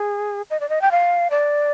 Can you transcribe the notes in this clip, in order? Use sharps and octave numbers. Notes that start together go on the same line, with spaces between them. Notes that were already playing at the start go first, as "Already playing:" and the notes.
Already playing: G#4
D#5
D5
D#5
G5
F5
D5